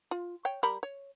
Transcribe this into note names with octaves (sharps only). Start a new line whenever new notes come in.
F4
C#5 G5
G3 A#4 B5
C#5